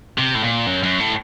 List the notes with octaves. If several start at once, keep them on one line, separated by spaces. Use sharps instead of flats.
C3
A2
A#2
F#2
F#2
A2